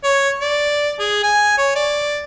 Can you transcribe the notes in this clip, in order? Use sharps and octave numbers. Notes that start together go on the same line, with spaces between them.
C#5
D5
G#4
G#5
C#5
D5